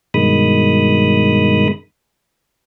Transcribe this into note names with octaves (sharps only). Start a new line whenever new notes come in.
G2 B2 D#3 G#3 B5 D#6